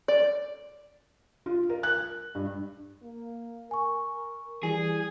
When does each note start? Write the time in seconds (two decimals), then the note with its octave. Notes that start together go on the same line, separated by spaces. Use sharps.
0.08 D5
1.46 F4
1.69 A#4
1.83 F#6
2.35 G2
3.02 A#3
3.71 A#4 G#5 C#6
4.63 E3 G3 G#4 G#5